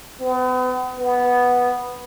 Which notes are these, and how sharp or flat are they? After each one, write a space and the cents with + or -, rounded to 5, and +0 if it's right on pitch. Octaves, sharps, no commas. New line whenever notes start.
B3 +40
B3 -5